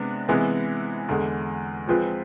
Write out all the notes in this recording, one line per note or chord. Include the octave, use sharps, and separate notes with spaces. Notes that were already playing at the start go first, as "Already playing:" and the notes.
Already playing: C3 G#3 B3 D4
C3 E3 G#3 B3 E4
E2 D3 G#3
F3 G#3 C4 F4 B4